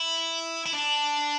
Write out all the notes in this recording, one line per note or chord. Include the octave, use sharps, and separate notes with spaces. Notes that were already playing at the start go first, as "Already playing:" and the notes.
Already playing: E4
E4
D4